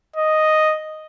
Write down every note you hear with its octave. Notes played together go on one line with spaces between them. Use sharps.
D#5